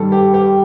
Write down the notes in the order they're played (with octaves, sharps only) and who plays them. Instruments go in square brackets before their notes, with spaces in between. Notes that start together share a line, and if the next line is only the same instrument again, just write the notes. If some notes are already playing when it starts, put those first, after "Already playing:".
Already playing: [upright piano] G2 D#3 G3 A4
G4
G4